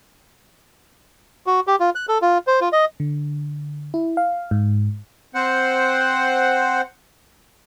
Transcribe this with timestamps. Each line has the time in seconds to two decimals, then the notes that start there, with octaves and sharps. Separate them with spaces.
1.46 F#4
1.67 G4
1.80 F4
1.95 F#6
2.08 A4
2.22 F4
2.47 C5
2.61 F4
2.73 D#5
3.00 D3
3.94 E4
4.17 F5
4.51 G#2
5.35 C4 C5 F#5